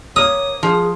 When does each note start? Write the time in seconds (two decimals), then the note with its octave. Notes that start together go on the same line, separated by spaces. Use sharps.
0.16 A#3 C#5 D#6
0.63 F3 G#4